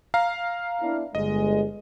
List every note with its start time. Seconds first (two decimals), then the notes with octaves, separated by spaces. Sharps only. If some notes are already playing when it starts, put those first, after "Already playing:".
0.14 F5 A#5
0.82 B3 D4 E4
1.15 G1 G#3 D#5